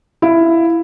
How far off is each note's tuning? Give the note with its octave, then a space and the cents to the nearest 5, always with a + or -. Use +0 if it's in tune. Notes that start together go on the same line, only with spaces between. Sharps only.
E4 +10 F5 +0